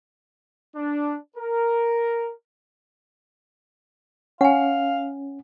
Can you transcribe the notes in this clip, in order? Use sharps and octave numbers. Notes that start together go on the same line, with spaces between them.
D4
A#4
C#4 F5 F#5 G#5